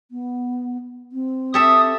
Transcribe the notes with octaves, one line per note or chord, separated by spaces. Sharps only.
B3
C4
G4 A4 E5 D#6